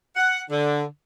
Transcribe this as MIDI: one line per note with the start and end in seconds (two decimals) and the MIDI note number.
0.16 0.41 78
0.50 0.83 50